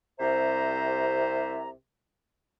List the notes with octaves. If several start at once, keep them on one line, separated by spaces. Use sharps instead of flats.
C2 C3 C5 E5 A#5